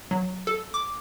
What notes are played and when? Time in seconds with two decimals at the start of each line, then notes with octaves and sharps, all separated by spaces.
0.11 F#3
0.47 A4
0.74 D6